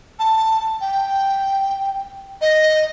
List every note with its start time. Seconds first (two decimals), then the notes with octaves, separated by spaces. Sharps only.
0.19 A5
0.81 G5
2.41 D#5